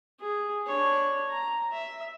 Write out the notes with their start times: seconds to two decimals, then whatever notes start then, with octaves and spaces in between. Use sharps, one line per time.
0.20 G#4
0.66 D4 C#5
1.30 A#5
1.72 E5